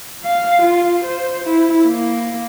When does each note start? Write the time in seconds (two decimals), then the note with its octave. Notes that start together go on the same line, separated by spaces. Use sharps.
0.24 F5
0.62 F4
1.04 C5
1.44 E4
1.86 A#3